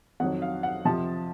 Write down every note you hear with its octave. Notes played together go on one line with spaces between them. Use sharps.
F2 D#3 F#3 F#5
F5
F#5
F2 C3 F3 A5